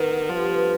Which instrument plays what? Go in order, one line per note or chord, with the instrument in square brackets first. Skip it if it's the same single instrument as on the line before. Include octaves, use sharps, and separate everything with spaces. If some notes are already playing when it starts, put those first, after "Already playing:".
Already playing: [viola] D#3 [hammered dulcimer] B3
[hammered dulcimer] D3
[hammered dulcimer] G2 [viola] F3
[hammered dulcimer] B3